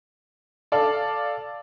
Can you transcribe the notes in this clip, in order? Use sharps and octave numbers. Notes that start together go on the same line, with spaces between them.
A4 D5 F5